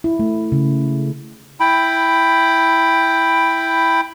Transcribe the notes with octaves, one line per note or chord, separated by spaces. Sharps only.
E4
A3
C#3
E4 G5 B5